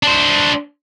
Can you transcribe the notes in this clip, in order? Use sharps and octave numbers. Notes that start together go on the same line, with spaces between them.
D4 C5